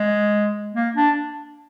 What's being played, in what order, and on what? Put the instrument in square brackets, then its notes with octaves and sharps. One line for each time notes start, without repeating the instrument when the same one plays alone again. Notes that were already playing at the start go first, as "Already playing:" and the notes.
Already playing: [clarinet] G#3
A#3
D4